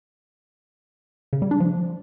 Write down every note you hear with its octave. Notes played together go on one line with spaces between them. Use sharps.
C#3
G3
D4
F3